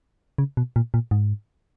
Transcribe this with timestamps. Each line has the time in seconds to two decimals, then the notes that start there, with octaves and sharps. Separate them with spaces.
0.38 C#3
0.57 B2
0.76 A#2
0.94 A#2
1.11 G#2